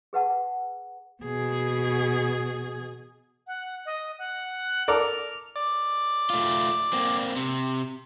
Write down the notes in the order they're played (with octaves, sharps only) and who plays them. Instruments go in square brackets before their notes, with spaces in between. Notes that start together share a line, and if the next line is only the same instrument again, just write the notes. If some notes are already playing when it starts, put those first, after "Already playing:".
[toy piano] G#4 B4 F#5 A5
[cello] B2 G#4
[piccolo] F#5
D#5
F#5
[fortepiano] A4 A#4 D5 [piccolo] F7
[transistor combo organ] D5
[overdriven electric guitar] A3 F4
A#3 C4
C3